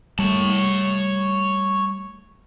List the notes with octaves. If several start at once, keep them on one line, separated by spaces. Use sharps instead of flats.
G3 A3 C#5 A5